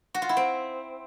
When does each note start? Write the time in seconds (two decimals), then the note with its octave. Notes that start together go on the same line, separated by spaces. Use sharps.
0.15 F#4
0.22 F4
0.29 E4
0.37 C4